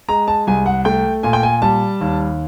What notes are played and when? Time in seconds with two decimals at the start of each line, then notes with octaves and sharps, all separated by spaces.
0.08 G#3 A#5
0.28 A5
0.47 C2 G#5
0.66 F#5
0.85 A3 G5
1.23 A#2 G#5
1.33 G5
1.43 G#5
1.62 G3 A5
2.01 D#2